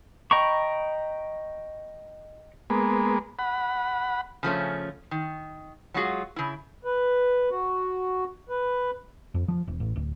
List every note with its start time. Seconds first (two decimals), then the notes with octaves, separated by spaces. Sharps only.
0.31 D#5 G5 A#5 B5 C#6
2.70 G#3 A#3 B3
3.39 F#5 B5
4.43 C#3 F3 A3 C#4
5.11 D#3
5.94 F#3 G#3 F4 F#4 G#4
6.36 C#3 E4
6.85 B4
7.50 F#4
8.49 B4
9.34 F2
9.48 F3
9.68 E1
9.80 A1
9.96 D1